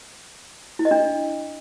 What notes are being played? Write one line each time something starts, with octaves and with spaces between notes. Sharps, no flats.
E4
D#5
D4